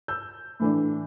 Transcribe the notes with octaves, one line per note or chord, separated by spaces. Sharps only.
E6 G6
A2 E3 A3 D4